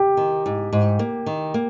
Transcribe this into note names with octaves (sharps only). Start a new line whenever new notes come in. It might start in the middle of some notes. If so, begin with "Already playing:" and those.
Already playing: G4
D#3
G#2
G#2
A#3
D#3
A#3